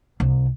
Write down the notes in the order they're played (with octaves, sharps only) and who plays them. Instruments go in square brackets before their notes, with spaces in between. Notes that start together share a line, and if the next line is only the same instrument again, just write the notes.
[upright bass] C2